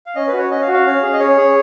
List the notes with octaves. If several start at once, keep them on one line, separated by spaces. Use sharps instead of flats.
F5
C#4 D#5
B4
F#4
C#5
C#4 D#5
F5
F#4
F5
C#4
G#4
D#5
C#4 C#5
G#4